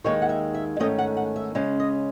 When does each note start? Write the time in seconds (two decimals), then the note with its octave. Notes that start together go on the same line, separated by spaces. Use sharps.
0.04 D#2 D#3 G#3 C#5
0.22 F#5
0.29 E5
0.54 E5
0.80 G#2 D#3 A3 C#4 D#5
0.98 F#5
1.17 F#5
1.36 E5
1.55 C#3 G#3 C#4
1.80 D#5